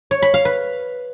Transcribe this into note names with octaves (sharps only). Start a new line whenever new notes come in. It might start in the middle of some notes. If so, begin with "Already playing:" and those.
C#5
B5
F5
B4